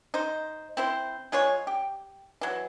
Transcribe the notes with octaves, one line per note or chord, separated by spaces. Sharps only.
D#4 C5
C4 E4 C5
G#3 F4 G#4 C#5
G4
E3 F#3